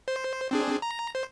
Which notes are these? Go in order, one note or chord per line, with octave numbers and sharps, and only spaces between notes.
C5
C4 D4 G#4
A#5
C5